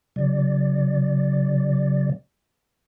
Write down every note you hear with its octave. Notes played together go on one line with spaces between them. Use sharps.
C#3 F#3 D5